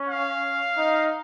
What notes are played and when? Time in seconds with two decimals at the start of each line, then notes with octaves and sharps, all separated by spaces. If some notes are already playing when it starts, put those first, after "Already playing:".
Already playing: C#4
0.09 F5
0.78 D#4